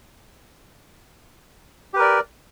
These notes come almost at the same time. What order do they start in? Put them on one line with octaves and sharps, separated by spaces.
G4 B4 A#4 D5